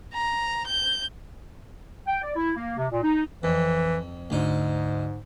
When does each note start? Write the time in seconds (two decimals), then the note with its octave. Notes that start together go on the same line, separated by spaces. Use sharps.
0.14 A#5
0.67 G6
2.08 G5
2.23 D5
2.36 E4
2.56 A#3
2.77 C3
2.91 A#2
3.03 D#4
3.43 F2 E3
4.30 D2 G#2 D#4